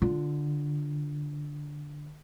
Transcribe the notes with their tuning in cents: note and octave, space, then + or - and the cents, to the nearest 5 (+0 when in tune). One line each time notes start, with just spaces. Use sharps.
D3 +0 F4 +0